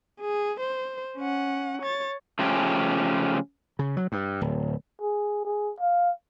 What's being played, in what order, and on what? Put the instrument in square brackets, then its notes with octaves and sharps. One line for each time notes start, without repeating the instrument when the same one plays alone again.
[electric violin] G#4
C5
C#4 F#5
C#5 A6
[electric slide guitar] C#3 F3 A3 C#4 G4
[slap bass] C#3
F#3
G2
D1
[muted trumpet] G#4
G#4
F5